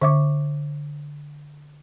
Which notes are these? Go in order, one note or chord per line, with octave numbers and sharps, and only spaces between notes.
D3 E5 D6